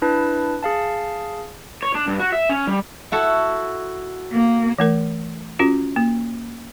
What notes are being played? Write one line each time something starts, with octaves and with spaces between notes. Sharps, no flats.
D4 E4 B4 A5
G#4 F5 A5
C#5
D4
G2
F#4
E5
C#4
G3
E4 F#4 A4
A#3
E3 A3 A#4
C#4 F4 F#4
A#3